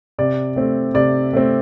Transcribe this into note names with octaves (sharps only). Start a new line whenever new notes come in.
C3 D5
A3 C4
C3 D5
A3 C4